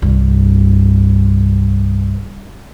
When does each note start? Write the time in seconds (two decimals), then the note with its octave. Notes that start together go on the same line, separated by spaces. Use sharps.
0.02 C2 G2